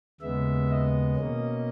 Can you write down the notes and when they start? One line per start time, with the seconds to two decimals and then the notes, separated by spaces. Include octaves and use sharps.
0.21 D#2 C#3 G#3 B3 E5
0.69 D#5
1.16 B2 A#3 C#4